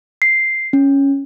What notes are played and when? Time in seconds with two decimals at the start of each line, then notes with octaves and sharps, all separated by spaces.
0.22 C7
0.73 C#4